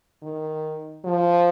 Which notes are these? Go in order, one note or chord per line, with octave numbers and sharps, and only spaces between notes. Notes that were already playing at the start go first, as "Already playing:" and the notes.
D#3
F3